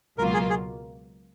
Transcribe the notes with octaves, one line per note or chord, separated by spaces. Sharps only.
C#2 B2 F#3 A#3 F4 A#4
G#4
G#4